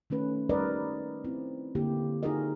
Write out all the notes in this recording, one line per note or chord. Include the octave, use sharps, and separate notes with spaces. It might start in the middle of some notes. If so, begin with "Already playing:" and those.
D#3 A3 C#4 B4
G3 D#4 A#4 B4 D5 D#5
C4 E4
D3 A#3 E4 G4
D#4 F4 F#4 G#4 A#4 D#5